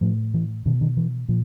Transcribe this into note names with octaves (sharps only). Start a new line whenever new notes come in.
A2 F3
E3
B2 D#3
D#3
E3
A#2 F3